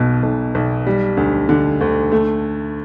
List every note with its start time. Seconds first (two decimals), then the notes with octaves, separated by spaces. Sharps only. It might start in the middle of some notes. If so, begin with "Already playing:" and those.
Already playing: B1 B2
0.23 B1
0.55 B1
0.87 G3
1.17 D2
1.49 D3
1.81 D2
2.12 A3